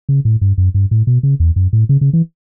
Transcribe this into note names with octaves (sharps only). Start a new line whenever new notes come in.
C#3
A2
G2
F#2
G2
A2
B2
C#3
E2
F#2
A2
C#3
C#3
E3